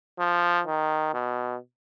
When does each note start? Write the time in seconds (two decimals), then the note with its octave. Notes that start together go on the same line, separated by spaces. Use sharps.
0.19 F3
0.67 D#3
1.14 B2